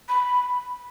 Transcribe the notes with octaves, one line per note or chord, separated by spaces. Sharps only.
B5